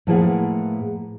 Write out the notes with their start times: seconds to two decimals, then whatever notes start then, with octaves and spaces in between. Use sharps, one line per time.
0.07 A2 F3 A#3 G#4 B4 F#5